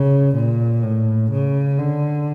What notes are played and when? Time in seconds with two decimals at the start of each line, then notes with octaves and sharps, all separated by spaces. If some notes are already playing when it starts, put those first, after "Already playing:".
Already playing: C#3
0.35 A#2
0.83 A2
1.31 C#3
1.79 D3